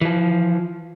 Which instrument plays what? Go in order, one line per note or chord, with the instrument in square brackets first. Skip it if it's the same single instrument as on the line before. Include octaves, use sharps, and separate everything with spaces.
[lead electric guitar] E3 F3